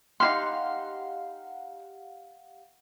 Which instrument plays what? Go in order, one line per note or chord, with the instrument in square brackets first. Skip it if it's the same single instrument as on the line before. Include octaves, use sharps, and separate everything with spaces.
[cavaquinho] D#4 E4 C6 [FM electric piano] G4 F5 F#5